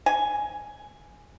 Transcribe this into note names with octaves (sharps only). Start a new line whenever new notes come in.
G#5